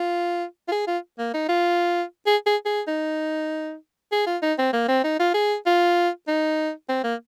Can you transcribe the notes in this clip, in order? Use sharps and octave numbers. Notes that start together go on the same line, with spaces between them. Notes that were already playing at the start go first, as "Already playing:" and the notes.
Already playing: F4
F4
G#4
F4
A#3
D#4
F4
G#4
G#4
G#4
D#4
G#4
F4
D#4
C4
A#3
C4
D#4
F4
G#4
F4
D#4
C4
A#3